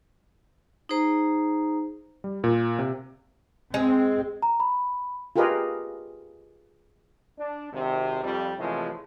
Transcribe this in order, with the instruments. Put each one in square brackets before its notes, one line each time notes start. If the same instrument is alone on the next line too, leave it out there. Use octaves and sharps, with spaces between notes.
[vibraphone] D#4 G#4 C5 A#5
[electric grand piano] G3
A#2
C3
[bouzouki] G#3 [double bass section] C4
[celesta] A#5
B5
[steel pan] F4 G4 G#4 A#4 B4 D#5
[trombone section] D4
G#1 C3
F2 G3
C3 E3 F3 G#3 A3 C#4